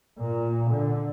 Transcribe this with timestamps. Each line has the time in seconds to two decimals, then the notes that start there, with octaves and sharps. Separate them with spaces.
0.20 A#2
0.72 D3